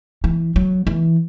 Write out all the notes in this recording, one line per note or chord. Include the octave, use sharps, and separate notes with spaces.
E3
F#3
E3